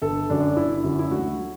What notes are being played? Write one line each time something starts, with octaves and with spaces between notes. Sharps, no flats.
G1 A4
F#2 D3 F#3 D4
G1 E4
F#2 D3 F#3
E4
D2 F#4
F#3